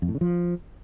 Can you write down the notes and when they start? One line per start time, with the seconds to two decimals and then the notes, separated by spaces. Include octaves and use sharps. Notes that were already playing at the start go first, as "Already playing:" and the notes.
0.02 F2
0.08 A2
0.15 C#3
0.21 F3